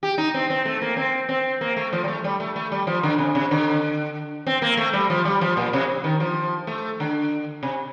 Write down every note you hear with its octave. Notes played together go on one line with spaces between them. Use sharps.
G4
D#4
C4
C4
A3
A#3
C4
C4
A#3
A3
F3
G3
A3
G3
A3
A3
G3
F3
D3
C3
C3
D3
C4
A#3
A3
G3
F3
G3
F3
A#2
C3
D#3
F3
A3
D3
C3